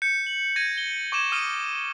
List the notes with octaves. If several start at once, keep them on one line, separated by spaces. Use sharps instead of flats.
G6 C#7
F#7
G#6 A#6 D#7
G7
C#6 D6 G#6 E7
D#6 F6 D#7 G7